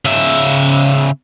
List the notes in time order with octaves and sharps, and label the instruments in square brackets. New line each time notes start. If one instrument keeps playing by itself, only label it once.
[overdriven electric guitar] C#3 E5